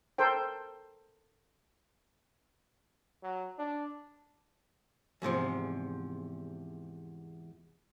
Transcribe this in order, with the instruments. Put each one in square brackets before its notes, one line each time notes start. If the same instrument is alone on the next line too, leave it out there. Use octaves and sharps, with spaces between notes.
[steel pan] A4 A#4 C5 G5
[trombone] F#3
D4
[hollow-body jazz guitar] E2 G#2 C3 F3